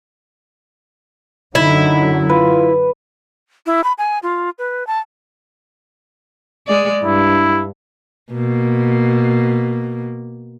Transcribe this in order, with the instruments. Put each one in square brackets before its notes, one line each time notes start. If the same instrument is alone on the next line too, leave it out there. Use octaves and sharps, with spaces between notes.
[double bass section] F#2 D3 F#3 [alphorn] D#4 [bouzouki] E4
[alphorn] F4 [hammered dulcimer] B4
[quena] E4
B5
G#5
F4
B4
A5
[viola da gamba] G#3 D5
[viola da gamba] G2 [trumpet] E4
[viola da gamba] B2 A#3